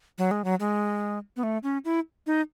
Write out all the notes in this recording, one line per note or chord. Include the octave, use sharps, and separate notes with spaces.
F#3
G#3
F#3
G#3
B3
A3
C#4
E4
D#4